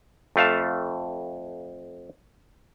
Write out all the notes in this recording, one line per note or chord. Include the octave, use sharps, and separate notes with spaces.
F2 A3 F5 A5